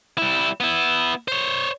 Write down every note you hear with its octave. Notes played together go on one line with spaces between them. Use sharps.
G3 E4
B3 E4
C5 C#5